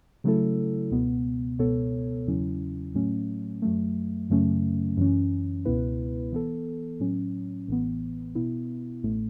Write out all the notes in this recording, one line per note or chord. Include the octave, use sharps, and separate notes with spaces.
C#3 F#3 A3 E4 A4
C#2 B2 B3
C#2 B2 B3 A4 C#5
E2 C#3 F#3 C#4 E4
A2 F#3 A3 C#4
F#2 F#3 A3
F#2 C#3 F#3 A3 C#4
F#2 E3 C#4
C#2 B2 B3 E4 B4
E3 B3 A4
A2 F#3 C#4
A1 A2 E3 B3
B2 B3 E4
A1 A2 A3